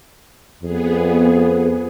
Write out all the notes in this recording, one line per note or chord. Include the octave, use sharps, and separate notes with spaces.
F2 B3 G#4